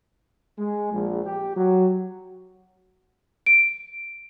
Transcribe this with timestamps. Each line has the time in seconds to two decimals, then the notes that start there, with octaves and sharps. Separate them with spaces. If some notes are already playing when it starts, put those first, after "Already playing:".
0.58 G#3
0.92 A#1
1.25 G4
1.55 F#3
3.46 D7